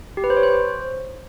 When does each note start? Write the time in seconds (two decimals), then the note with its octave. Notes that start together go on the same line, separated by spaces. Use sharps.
0.17 G4
0.24 B4
0.30 C5
0.37 C#5
0.43 C5